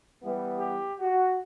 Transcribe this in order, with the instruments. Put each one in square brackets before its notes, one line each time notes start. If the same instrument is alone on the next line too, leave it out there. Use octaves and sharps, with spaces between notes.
[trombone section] E3 G3 B3
G4
F#4